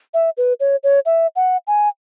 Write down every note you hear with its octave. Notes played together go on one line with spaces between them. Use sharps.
E5
B4
C#5
C#5
E5
F#5
G#5